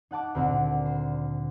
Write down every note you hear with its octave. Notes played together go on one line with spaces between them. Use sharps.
D#4 F#5 A5 D6
D2 A#2 C4
C5